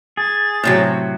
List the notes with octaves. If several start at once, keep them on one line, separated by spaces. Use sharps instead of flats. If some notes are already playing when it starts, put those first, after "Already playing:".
G#4 A6
A2 C3 F#3